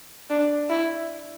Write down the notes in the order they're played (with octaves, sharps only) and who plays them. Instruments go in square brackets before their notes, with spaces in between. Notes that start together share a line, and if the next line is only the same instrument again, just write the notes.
[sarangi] D4
E4